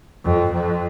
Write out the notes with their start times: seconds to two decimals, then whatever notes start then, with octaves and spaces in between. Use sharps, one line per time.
0.24 F2
0.52 F2